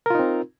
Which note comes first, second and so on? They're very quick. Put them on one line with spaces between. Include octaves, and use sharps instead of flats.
A#4 F4 D#4 C4